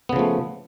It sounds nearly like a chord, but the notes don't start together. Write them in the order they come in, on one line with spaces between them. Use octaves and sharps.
B3 C#3 F3 A3